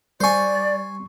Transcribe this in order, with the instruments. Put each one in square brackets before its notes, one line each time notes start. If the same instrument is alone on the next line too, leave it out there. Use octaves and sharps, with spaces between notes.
[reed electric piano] G3 C#6 [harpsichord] C5 G#5 [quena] D5